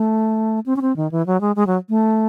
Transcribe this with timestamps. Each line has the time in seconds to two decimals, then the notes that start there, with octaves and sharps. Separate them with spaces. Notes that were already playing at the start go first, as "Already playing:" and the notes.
Already playing: A3
0.66 C4
0.76 C#4
0.82 C4
0.96 D#3
1.12 E3
1.26 F#3
1.41 G#3
1.56 G#3
1.67 F#3
1.89 A3